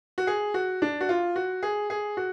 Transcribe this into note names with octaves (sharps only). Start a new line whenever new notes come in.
F#4
G#4
F#4
D4
F#4
F4
F#4
G#4
G#4
F#4